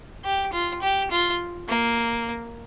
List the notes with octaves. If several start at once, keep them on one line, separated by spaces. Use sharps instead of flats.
G4
F4
G4
F4
A#3